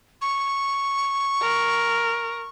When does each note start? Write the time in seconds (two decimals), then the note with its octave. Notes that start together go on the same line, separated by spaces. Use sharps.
0.22 C#6
1.41 A#4